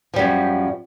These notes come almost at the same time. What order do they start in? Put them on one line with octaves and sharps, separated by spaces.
F3 G3 F#2